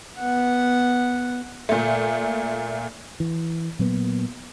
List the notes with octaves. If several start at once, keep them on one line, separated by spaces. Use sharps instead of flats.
B3 F#5
A#2 A3
E3
A#2 F#3 A#3 B3